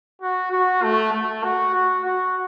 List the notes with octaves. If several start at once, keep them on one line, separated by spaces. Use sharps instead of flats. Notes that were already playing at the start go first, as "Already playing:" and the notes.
F#4
F#4
A3
A3
F#4
F#4
F#4